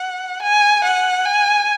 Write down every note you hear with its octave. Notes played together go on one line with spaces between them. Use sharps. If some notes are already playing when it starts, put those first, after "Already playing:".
Already playing: F#5
G#5
F#5
G#5